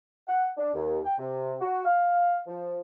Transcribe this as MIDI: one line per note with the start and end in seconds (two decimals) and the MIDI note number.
0.28 0.47 78
0.57 0.69 62
0.74 0.98 39
1.04 1.14 79
1.18 1.54 48
1.61 1.83 66
1.84 2.39 77
2.47 2.77 53